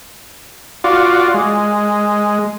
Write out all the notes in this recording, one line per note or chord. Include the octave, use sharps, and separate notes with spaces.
F4 F#4 D5
G#3